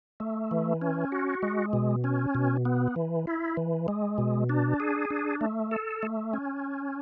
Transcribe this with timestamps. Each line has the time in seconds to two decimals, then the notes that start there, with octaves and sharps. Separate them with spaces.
0.20 A3
0.51 E3
0.81 C#4
1.12 F#4
1.43 G#3
1.73 B2
2.04 C#4
2.35 B2
2.65 B3
2.96 E3
3.27 E4
3.57 E3
3.88 G#3
4.18 B2
4.49 D4
4.80 G#4
5.10 D4
5.41 A3
5.71 A4
6.03 A3
6.33 C#4